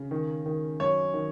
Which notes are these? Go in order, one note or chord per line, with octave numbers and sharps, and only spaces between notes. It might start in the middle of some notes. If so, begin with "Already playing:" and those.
Already playing: C#3
D#3
D#3
F#2 C#5
D#3